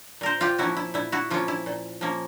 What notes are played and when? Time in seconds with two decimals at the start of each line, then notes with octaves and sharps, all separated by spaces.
0.21 A#2 A#4 C5
0.41 F4 G4
0.58 F3 A#3 C#4 E4 F#4
0.77 E4
0.94 A#2 E4
1.12 E4 F#4
1.31 F3 A#3 C#4 F4
1.48 E4
1.66 A#2
2.01 F3 A#3 C#4